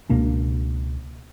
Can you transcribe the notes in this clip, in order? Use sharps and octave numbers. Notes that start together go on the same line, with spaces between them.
C#2 B2 A#3 D4